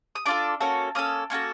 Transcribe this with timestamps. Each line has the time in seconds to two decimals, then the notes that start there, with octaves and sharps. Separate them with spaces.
0.15 D#6
0.26 D4 F4 A4 D5 D6
0.60 A#3 C#4 F#4 A4
0.95 A#3 C#4 A4 D#6
1.30 A#3 C#4 F#4 A4